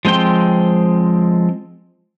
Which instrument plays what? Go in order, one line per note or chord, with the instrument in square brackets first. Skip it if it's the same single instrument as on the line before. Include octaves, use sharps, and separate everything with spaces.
[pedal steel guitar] F3 G#3 C4 G5 C6